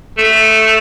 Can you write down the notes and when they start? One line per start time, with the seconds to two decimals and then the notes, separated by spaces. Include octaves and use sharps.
0.18 A3